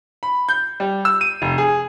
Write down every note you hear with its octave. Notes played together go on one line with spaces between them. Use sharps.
B5
G6
G3
E6
D#7
F1
G#4